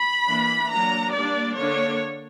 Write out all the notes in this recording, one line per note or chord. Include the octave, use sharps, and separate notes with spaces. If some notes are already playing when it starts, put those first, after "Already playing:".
Already playing: B5
E3 A#3 D4
F#3 A#3 D4 A#5
G3 A#3 D4 D5
D3 A#3 D4 C#5